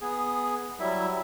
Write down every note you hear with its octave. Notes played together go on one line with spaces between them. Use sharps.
B3 G#4
F#3 G3 E4 E5